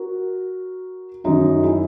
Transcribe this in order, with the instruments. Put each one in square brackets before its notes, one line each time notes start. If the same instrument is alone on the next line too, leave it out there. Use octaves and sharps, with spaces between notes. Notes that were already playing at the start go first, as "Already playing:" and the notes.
Already playing: [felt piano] F#4 A#4
F#2 D#3 D#4 F#4
E4 G#4